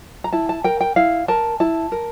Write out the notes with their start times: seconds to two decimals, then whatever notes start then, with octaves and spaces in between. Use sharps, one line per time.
0.24 A#5
0.33 E4 A5
0.49 A5
0.64 A#4 G5
0.81 G5
0.96 E4 F5
1.28 A#4 A5
1.60 E4 A5
1.92 A#4